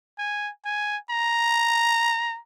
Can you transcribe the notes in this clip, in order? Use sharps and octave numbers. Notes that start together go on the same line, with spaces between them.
G#5
G#5
A#5